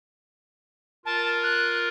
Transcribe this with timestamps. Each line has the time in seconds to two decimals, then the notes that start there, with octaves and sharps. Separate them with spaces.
1.05 F4 A#4 A5
1.43 F#6